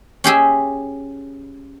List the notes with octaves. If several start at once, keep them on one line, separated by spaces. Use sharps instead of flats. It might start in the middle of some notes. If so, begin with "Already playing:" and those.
C#4 G4 G#4 E5